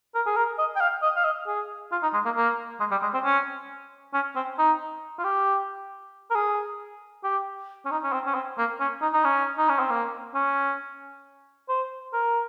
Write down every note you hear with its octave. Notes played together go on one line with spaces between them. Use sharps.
A#4
G#4
A#4
D#5
G5
F5
D#5
F5
D#5
G#4
F4
D#4
G#3
A#3
A#3
G#3
G3
G#3
C4
C#4
C#4
C4
D#4
F4
G4
A#4
G#4
G4
C#4
D#4
C#4
C4
C#4
C4
A#3
C#4
D#4
D#4
C#4
D#4
C#4
C4
A#3
C#4
C5
A#4